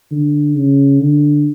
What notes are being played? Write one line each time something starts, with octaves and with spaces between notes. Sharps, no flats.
D3
C#3
D3